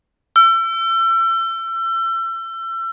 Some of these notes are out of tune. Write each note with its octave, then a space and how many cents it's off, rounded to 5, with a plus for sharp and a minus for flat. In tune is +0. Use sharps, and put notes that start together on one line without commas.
E6 +35